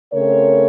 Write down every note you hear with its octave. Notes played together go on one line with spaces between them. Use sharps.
C#3 A3 C4 A#4 C#5